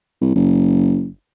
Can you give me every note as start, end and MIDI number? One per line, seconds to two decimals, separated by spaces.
0.21 0.31 36
0.35 1.08 30